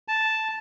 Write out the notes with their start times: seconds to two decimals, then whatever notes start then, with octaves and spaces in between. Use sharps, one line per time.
0.08 A5